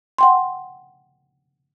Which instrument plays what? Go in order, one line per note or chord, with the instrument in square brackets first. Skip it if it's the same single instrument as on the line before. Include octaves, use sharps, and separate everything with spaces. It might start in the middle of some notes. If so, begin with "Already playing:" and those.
[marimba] F#5 G5 C6